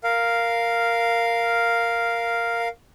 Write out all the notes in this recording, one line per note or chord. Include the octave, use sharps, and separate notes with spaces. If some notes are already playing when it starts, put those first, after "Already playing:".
A#4 F5